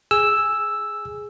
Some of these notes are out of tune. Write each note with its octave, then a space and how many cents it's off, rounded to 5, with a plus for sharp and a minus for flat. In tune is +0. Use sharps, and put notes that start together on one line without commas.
G#4 +0 G#5 -5 E6 +0